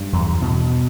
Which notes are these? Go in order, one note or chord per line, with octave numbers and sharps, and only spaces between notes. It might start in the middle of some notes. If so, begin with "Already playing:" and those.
Already playing: G2
E2
B2